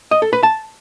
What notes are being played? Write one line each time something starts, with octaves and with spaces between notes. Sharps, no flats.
D#5
A4
B4
A5